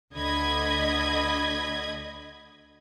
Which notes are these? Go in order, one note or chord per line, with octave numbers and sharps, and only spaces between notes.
D2 D3 D#5 B5 G#6